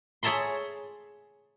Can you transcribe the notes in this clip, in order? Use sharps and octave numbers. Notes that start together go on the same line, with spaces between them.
G#4 C#5 E5 A5 A#5 C6